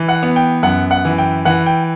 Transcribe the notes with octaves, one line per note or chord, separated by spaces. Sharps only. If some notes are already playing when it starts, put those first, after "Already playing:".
Already playing: E3
F#5
B3
G5
F#2 F#5
F#5
E3
G5
E3 F#5
G5